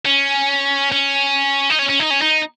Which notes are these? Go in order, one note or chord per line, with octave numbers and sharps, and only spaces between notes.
C#4
C#4
D#4
C#4
C#4
D#4
C#4
D#4